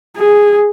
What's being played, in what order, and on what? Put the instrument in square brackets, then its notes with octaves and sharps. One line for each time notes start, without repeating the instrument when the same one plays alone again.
[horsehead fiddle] G#4